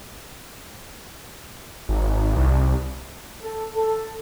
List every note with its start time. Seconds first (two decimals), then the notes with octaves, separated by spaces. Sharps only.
1.89 G#1
2.36 C2
3.42 A4
3.75 A4